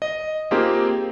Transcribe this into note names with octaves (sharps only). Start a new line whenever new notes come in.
D#5
A#3 C4 D#4 F4 G4 G#4